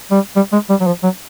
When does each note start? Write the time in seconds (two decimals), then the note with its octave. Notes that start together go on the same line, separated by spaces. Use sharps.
0.11 G3
0.36 G3
0.53 G#3
0.69 G3
0.81 F#3
0.87 F3
1.03 F#3